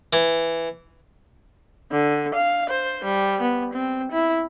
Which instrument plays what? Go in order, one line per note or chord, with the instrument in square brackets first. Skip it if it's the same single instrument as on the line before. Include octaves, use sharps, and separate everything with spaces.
[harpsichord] E3
[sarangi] D3
F5
C5
G3
B3
C4
E4